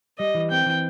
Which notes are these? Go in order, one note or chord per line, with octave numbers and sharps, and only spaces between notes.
G3 D#5
E3
C4 G5
E3